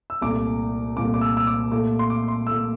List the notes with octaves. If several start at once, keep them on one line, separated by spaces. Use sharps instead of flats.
E6
C2 A#2 A3 D6
C2 A#2 A3 D6
D6
E6
E6
D6
A#2 A3 D6
C6
D6
C6
A#2 A3 E6